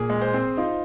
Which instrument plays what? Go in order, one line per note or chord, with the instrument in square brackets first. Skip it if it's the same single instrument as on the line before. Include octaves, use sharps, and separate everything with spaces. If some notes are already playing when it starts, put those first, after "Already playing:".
Already playing: [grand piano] A#2 G#4
[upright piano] G#3
[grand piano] C5
[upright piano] C4
[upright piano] D#4 [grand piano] F4